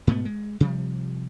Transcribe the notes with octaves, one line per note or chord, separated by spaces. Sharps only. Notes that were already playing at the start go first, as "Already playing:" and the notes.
G#2 B2 A3 B3
G#3
C3 F3 G3